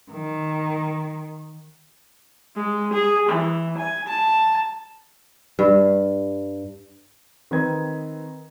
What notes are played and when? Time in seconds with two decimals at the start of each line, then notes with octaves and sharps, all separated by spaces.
0.12 D#3
2.56 G#3
2.94 G#4
3.29 E3
3.78 G#5
4.08 A5
5.59 G2
7.51 D#3 C4 B4 D#5 G#6